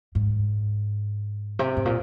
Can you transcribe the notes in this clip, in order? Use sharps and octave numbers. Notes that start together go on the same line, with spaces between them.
G#2
C3
G#2
A#2